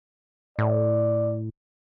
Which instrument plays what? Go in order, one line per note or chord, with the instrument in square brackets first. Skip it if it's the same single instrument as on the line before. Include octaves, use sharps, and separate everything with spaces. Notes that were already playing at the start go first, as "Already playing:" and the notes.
[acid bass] A2 [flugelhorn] D5